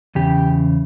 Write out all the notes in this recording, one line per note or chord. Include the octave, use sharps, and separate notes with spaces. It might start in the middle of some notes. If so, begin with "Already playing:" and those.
E2 C#3 G4